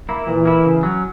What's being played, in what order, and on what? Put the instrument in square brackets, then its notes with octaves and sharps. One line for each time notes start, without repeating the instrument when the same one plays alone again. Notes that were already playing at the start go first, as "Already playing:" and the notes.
[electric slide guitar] A#3 E4
[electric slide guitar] A#2 [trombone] E3
[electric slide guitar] A#3 E4
C#3
F#3 C#4